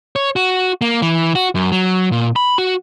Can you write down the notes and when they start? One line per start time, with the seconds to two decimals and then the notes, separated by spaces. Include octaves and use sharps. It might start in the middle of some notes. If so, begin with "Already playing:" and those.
0.16 C#5
0.36 F#4
0.81 A#3
1.02 E3
1.35 F#4
1.55 F#2
1.72 F#3
2.12 A#2
2.36 B5
2.58 F#4